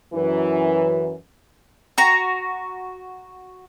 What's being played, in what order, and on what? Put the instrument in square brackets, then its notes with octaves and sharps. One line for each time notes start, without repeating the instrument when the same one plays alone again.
[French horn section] F#2 E3
[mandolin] F#4 A#5